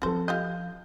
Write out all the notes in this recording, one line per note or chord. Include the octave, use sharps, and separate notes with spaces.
F3 C4 C#4 F#4 A4 C5
F4 G4 D#5 G6